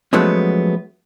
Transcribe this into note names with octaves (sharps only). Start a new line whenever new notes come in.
F3 F#3 G#3 A3 B3 C#4